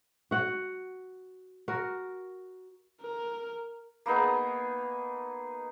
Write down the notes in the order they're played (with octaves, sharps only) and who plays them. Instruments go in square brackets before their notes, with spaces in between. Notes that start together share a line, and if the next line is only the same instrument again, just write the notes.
[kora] F#4 F#5
F#4 A#4
[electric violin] A#4
[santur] A#3 B3 D#4 G#4